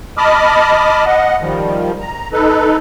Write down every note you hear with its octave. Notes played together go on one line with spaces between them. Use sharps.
D#5 A5 B5 D6 D#6 F6
D#5 F#5
D#3 F3 G3
A#5
D#4 A4 B4